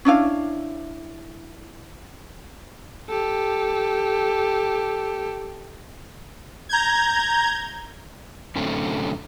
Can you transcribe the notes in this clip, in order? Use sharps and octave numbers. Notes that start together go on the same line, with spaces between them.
C#4 D4 E4 F5
G4 A4
A#5 G6 G#6
F#2 A2 D3 A3 C4 C#4